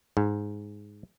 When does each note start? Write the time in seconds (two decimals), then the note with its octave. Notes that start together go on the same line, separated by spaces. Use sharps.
0.17 G#2